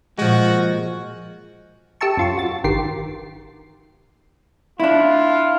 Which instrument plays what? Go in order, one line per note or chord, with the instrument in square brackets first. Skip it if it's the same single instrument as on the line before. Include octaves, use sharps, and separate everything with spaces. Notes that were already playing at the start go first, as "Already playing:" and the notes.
[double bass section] A#2 [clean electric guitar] F3 G#3 [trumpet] F#4
[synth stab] G4 A4 E5 A5 C#6
F#2 F4 C#6
F#4 A6
G1 D#3 G4 C6 C7
[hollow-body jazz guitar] D4 E4 [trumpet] F4